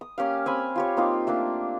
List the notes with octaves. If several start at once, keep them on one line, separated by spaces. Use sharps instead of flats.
D#6
A#3 C#4 G4 F5
C4 G#5 B5
F4 G4 C#5
A#3 C4 D#4 F4
A3 A#3 D4